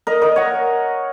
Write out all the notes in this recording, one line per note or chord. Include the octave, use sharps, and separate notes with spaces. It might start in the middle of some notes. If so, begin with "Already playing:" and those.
A#4 D#5
A#4 D#5
C#5 F#5